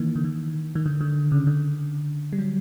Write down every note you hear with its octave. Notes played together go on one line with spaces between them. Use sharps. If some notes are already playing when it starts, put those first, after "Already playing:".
Already playing: D#3 E3 A#3
D3
D#3
D#3
D3
D3
C#3
D3
G3
F#3